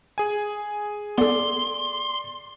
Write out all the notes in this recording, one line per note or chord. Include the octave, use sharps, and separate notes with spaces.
G#4 G#5
B3 A4 D5 C6